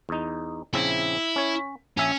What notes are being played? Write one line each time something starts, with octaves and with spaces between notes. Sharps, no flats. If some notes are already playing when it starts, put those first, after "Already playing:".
E2 D#4
A#1 C#3 C4 E4
C#4 C#5
A#1 C#4 E5 G#5